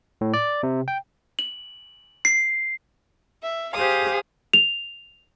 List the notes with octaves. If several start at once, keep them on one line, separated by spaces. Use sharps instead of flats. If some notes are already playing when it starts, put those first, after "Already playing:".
A2
D5
C3
G5
F#7
C7
E5
G4 G#4 C5 F5 D#6
F7